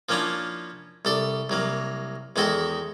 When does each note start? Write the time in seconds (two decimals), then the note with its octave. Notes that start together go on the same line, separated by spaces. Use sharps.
0.09 F3 A#3 C#4 D4 E4 F4
1.05 C2 A4 D5
1.50 C2 F#3 A#3
2.36 E2 D#3 G#3 F#4 A4 E5